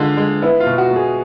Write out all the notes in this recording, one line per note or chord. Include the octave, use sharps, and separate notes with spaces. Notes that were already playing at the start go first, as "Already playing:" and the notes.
Already playing: D3 G#3 F4
G#3
B3 E4
F4
B2
F#4
B2
G#4